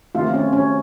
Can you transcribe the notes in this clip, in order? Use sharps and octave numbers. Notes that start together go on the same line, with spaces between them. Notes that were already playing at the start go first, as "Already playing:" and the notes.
C3 D#3 A3 F4
C#4
C#4